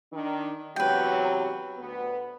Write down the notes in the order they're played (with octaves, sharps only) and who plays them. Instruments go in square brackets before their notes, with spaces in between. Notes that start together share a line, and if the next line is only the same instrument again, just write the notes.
[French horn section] D#3 D4
[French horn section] E2 C3 F#3 [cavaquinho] B4 G5
[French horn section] D2 B3